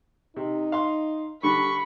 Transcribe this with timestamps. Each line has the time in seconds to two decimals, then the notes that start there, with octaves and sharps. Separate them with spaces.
0.36 C3 D#4
0.72 F5 C6
1.43 D3 G3 B5 C#6